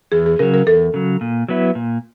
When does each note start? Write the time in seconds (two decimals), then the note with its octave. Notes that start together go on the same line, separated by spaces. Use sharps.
0.12 E2 G#4
0.26 G#4
0.39 C#3 F#3 A#4
0.54 A#4
0.67 E2 A4
0.94 C#3 F#3
1.21 A#2
1.49 F#3 B3 E4
1.75 A#2